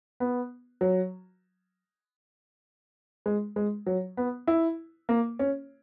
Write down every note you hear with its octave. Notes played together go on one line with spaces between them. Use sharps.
B3
F#3
G#3
G#3
F#3
B3
E4
A#3
C#4